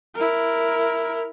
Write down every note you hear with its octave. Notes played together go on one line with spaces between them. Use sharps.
E4 A#4